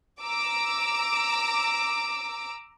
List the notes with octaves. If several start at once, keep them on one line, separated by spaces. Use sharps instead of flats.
A#5 D6 E6